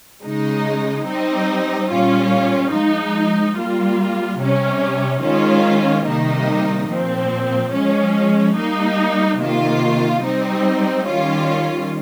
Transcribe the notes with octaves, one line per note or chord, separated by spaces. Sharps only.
C#3 G#3 D#4
G3 C4 D#4
A#2 G3 C#4 F4
F3 G#3 D#4
G3 A#3 F4
C3 G3 C#4
D#3 G#3 C#4 F4
C3 D#3 G3 A#3 D#4
A#2 F3 C4
F3 G#3 C#4
G3 A#3 D#4
C3 D#3 A#3 F4
G3 C4 D#4
D#3 G3 C#4 F4